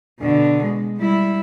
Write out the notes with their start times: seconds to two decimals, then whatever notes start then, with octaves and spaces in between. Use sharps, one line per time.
0.20 B2 D3
0.64 G#3
0.98 G3 E4